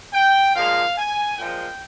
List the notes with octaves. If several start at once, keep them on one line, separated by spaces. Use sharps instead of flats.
G5
A#2 F3 G#3 F5
G#5
A#2 F3 G#3 G5